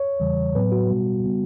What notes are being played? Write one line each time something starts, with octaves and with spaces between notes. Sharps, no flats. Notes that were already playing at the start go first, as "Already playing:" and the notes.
Already playing: C#5
E2 C#3 E3 G3
A2 F#3 B3 B4
F#4
B2 G3 B3
C#3 G3 B3